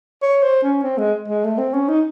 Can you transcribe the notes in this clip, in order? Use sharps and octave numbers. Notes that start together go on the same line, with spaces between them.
C#5
C5
C#4
C4
G#3
G#3
A3
C4
C#4
D#4